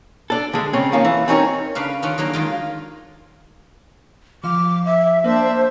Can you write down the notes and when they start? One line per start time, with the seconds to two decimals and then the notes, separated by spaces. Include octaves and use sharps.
0.30 D4 A4
0.53 D3 G#3
0.73 C#3 C4 C#4
0.92 D#3 F3 A#3 C#4
1.05 E3
1.28 C4 C#4 D#4 A#4 C#5
1.75 C#3 D4 B4 F5
2.02 D#3 C#4 D4 F4 F#5
2.18 D#3 F#3 A#3 D4
2.33 D#3 G#3 F4
4.44 F3 F5 D6
4.85 E5
5.24 A#3 D4 C5 E5